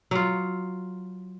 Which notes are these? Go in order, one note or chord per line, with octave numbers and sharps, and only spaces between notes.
F#3 F4